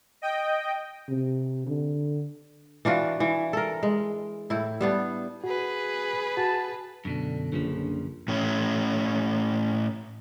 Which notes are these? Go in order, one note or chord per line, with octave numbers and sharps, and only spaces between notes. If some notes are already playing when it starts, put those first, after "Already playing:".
D#5 G5
C3
D3
E3 D4 F4 F#4
E3
A4 A#4
G#3
A2 E4
G3 B3 D4
F#4 G#4 B4
F#4 A5
F#2 B2 D3 D4
A#1 F#2 C#3 F3
A2 C#4